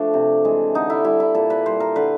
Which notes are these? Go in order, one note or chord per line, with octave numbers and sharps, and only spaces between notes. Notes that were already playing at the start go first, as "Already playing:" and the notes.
Already playing: F3 A3 D4
C3
E3 G#3
D3 D#4
E4
G3 E4
E4
A#2 A4
B4
G3 C5
A#4
D3 B4